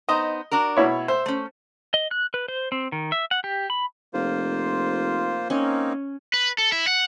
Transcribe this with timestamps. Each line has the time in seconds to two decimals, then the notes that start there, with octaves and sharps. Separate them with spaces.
0.09 B3 D#4 C5 D#5
0.51 D4 F#4 A#4
0.77 B2 E4 C#5
1.08 C5 E5
1.26 A3 C#4
1.94 D#5
2.11 F#6
2.34 B4
2.48 C5
2.72 C4
2.92 D#3
3.12 E5
3.31 F#5
3.44 G4
3.70 B5
4.14 F1 A#3 F4 C5
5.50 A#3 C4 C#4 D#4
6.34 B4
6.58 A4
6.72 E4
6.87 F#5